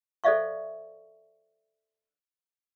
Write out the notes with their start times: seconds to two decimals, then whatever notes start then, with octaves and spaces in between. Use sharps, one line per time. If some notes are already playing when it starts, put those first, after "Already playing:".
0.24 A4 C5 D5 E5 F5 C#6